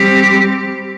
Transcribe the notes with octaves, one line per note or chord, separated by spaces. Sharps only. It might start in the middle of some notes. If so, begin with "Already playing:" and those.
Already playing: G3 C4 G4